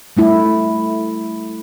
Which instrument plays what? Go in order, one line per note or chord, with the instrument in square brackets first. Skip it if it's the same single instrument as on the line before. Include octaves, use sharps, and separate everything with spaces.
[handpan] G3 A3 E4